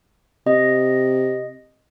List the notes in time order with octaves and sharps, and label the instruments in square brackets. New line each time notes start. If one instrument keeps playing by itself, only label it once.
[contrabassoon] C3 [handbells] D#5